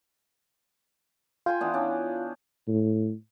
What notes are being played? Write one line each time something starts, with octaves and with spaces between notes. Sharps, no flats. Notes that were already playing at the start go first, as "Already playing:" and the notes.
F4 G5 G#5 C6
E3 B3 D4
C#4 D4
A2